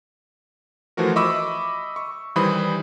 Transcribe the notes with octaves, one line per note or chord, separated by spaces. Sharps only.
E3 F3 A3 F#4 A#4
D#5 E5 B5 C#6 D6 E6
C#6
D#3 E3 G3 C5 B5 D#6